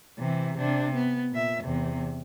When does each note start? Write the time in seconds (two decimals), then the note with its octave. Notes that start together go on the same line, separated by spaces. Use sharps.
0.19 C3 E3
0.58 C3 D4
0.94 B3
1.32 A#2 E5
1.64 E2 C3